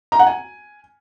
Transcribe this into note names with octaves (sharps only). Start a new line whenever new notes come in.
A#5
F#5
G#5